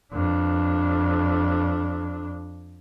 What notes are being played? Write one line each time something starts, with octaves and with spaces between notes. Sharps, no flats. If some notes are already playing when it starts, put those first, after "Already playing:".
F2 D4